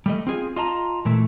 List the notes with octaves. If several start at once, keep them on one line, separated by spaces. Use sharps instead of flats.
G3 A3 D#5
C4 F4 G#4
F4 D#5 A5 A#5
A#2 E3 A3